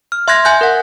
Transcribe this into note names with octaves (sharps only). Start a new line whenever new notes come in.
F6
E5 C6 F#6 G#6 A#6
E5 G#5 F#6 G6
A#4 F#5